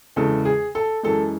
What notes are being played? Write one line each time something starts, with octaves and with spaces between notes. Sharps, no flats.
E2 C#3 G#3 A4
G#4
A4
F#2 E3 G#3 A4